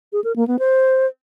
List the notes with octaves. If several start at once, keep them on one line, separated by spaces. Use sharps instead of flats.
G#4
A#4
A#3
B3
C5